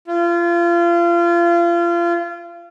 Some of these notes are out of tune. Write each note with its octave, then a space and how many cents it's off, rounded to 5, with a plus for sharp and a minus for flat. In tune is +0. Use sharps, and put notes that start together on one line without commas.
F4 -30